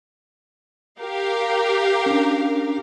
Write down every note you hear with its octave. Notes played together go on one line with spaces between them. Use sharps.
G4 A#4 F5
C#4 D4